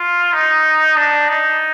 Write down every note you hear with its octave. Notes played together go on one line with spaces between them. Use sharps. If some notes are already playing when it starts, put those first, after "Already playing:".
Already playing: F4
D#4
D4
D#4